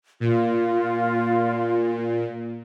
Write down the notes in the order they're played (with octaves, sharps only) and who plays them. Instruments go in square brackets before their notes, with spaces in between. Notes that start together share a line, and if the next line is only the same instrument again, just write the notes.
[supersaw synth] A#2 [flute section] F4